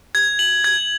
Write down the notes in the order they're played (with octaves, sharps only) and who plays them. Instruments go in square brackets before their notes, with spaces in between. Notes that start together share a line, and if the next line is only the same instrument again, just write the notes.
[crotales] G#6
F#7
G#6